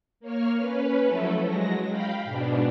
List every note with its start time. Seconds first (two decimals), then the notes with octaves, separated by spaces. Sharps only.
0.20 A#3 C#5 F6
0.57 C#4 B4
1.05 F3 F#3 A3 E4 A4
1.43 F#3 G#3 A#6
1.89 F5 G5 B5
2.24 G#2 B2 D4